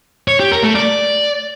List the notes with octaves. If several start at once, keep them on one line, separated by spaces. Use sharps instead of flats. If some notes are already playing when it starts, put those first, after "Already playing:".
C#5
G4
A#4
A3
D5